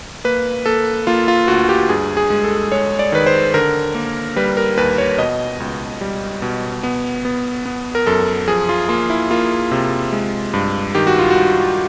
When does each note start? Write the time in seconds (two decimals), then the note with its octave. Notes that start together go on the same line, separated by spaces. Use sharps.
0.24 A#3 B4
0.66 A#3 A4
1.07 A#3 F4
1.28 F4
1.48 D2 F#4
1.69 G4
1.89 G2 G#4
2.17 G#4
2.30 G#3
2.44 A4
2.72 G#3 C#5
2.99 D5
3.12 D#3 B4
3.26 C5
3.54 D3 A#4
3.95 A#3
4.36 G3 B4
4.57 A#4
4.77 D#2 B4
4.98 C#5
5.18 B2 D#5
5.60 C#2
6.01 G3
6.42 B2
6.83 B3
7.25 B3
7.66 B3
7.95 A#4
8.07 F#2 A4
8.48 F3 G#4
8.69 F4
8.89 A#3 F4
9.10 E4
9.31 A#3 F4
9.72 C3
10.12 G#3
10.54 G2
10.95 D#3 G4
11.07 F#4
11.19 F4
11.30 F#4
11.36 G2